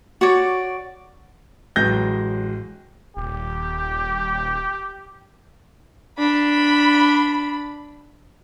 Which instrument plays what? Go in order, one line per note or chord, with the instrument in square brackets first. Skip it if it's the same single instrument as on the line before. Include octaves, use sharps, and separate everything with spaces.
[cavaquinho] F#4 C#5 D5
[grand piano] A1 F#3 G#3 G6 A#6
[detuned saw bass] D#1 [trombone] G4
[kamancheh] D4 B5